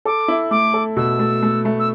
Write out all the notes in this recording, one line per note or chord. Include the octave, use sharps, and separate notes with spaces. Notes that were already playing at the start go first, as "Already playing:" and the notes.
A4 D6
E4
A3 D6
A4
B2 E6
A3
A3
A3
E6